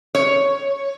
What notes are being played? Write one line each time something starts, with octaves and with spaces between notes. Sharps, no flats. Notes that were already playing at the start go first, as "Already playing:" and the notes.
C#5